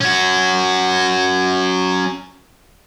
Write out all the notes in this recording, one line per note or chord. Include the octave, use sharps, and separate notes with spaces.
C#4 F#4